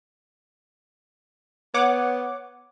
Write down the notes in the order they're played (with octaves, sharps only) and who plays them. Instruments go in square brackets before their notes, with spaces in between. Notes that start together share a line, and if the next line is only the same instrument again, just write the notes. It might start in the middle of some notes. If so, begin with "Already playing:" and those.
[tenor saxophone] B3 [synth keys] C#5 F#5 D6